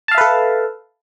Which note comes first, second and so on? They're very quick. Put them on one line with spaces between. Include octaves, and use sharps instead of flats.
A5 F5 E5 B4 A4